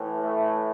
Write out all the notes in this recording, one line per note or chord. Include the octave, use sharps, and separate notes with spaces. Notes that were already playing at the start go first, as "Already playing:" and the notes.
Already playing: A2 E3
A3